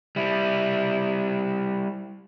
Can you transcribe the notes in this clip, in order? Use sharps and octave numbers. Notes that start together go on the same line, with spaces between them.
G3 E4